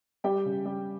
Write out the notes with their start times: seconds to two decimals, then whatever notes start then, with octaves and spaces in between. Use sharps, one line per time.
0.24 G3 G4 G5
0.46 C#3
0.66 G3